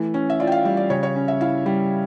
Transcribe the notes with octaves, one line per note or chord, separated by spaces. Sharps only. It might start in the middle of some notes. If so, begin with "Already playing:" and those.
Already playing: E3 A3
C#4
E5
F4 D5
G5
F5
G3 D5
D5
C#3 C#5
C#5
C#4
E5
E4 F5
G3